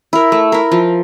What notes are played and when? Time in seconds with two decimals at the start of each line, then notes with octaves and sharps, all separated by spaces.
0.13 E4 A#4
0.32 A3
0.52 E4 A#4
0.71 F3